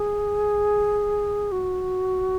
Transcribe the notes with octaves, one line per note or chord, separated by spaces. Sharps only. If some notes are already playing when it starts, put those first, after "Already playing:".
Already playing: G#4
F#4